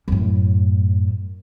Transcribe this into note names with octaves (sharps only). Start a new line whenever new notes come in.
F#2 A2